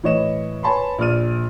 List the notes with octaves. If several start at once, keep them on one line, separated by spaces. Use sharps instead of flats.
A2 E3 C#5 D#5 E7
B4 C#5 G#5 A5 B5 C6
A#1 D5 F6 D#7